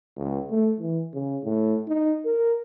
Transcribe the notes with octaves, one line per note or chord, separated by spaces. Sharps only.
C#2
A3
E3
C#3
A2
D#4
A#4